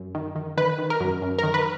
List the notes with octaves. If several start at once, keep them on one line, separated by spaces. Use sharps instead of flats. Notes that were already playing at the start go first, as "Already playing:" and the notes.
Already playing: F#2
D#3
D#3
D#3 B4
D#3
A#4
F#2
F#2
A#4
D#3
B4